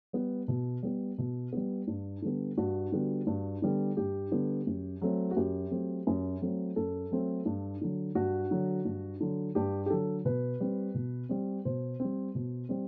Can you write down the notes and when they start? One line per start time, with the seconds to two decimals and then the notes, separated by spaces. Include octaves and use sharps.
0.13 G3 B3
0.48 B2
0.83 G3 B3
1.18 B2
1.53 G3 B3
1.87 G2
2.22 D3 G3 B3
2.57 G2 F#4
2.92 D3 G3 B3
3.27 G2
3.62 D3 G3 B3
3.97 G2 G4
4.32 D3 G3 B3
4.67 F#2
5.02 F#3 A3 C4
5.31 F#4
5.37 F#2 G4
5.71 F#3 A3 C4
6.07 F#2
6.42 F#3 A3 C4
6.76 F#2 A4
7.11 F#3 A3 C4
7.46 G2
7.81 D3 F#3
8.15 G2 F#4
8.51 D3 F#3
8.85 G2
9.20 D3 F#3
9.55 G2 G4
9.86 G4
9.90 D3 F#3 A4
10.25 B2 B4
10.60 G3 C4
10.95 B2
11.29 G3 C4
11.65 B2 C5
12.00 G3 C4
12.35 B2
12.69 G3 C4